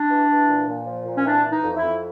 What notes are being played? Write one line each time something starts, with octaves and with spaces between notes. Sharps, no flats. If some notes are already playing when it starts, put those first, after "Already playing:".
Already playing: D4
E3
E3
A#2
A#2
F3
A#2
C#4
E3 D4
E3
D#4
F2
E4
F2